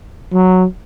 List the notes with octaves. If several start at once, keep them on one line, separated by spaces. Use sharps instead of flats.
F#3